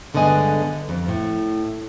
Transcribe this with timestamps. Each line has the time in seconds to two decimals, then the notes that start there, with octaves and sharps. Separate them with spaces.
0.14 G2 D3 G#3 B3 D#5 G#5
0.89 F2
1.08 A2